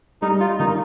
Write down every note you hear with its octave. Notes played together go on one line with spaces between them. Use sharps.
G3 D#4
F4
D#3 D#4